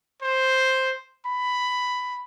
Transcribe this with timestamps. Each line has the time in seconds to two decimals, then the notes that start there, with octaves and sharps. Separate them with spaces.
0.22 C5
1.26 B5